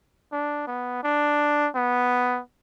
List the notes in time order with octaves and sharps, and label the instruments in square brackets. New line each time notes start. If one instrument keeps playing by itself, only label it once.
[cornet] D4
B3
D4
B3